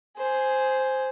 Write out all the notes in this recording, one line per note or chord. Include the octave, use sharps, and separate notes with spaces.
G#4 C5